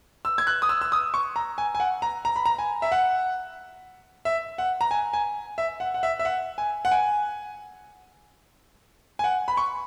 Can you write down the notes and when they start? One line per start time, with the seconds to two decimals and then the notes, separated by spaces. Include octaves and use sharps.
0.25 E6
0.38 G#6
0.47 F#6
0.62 D#6
0.69 E6
0.81 E6
0.92 D#6
1.14 C#6
1.36 A#5
1.58 G#5
1.75 G#5
1.80 F#5
2.02 A#5
2.25 A#5
2.36 B5
2.46 A#5
2.59 G#5
2.82 E5
2.92 F#5
4.25 E5
4.58 F#5
4.81 A#5
4.91 G#5
5.13 G#5
5.58 E5
5.80 F#5
5.94 F#5
6.03 E5
6.19 E5
6.25 F#5
6.58 G#5
6.85 F#5
6.91 G#5
9.19 G#5
9.24 F#5
9.48 B5
9.57 C#6